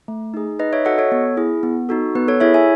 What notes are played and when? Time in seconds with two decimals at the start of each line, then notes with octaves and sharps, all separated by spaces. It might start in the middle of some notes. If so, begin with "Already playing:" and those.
0.08 A3
0.34 D#4 G#4
0.59 D#4 B4 D#5
0.73 C#5 E5
0.85 F#4 A4 D#5 F#5
0.98 A4 C#5
1.12 B3
1.37 E4 G#4
1.63 B3
1.89 D#4 F#4 A4
2.15 B3 B4
2.28 A4 C#5
2.40 E4 G#4 C#5 E5
2.54 E5 G#5